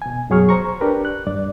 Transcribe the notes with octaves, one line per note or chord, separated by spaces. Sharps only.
B2 G#5
F#2 B2 F#3 G#4 C#6 F6
C5 A#5 C#6
D4 G4 A#4 B4
F#6
G2 D5